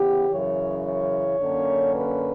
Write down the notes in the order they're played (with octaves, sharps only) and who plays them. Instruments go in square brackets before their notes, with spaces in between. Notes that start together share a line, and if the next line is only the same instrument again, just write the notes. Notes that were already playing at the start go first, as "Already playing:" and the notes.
Already playing: [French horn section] C#3 E3 B3 G4
F#2 C#3 E3 C#5
C#5
F#2 D3 A#3 C#4
B4